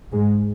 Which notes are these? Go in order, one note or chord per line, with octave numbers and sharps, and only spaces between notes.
G#2 G#3